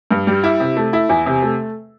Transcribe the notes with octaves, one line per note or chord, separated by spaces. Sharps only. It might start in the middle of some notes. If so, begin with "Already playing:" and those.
G2
G3
E4
C3
A3
E4
E2
C3
A3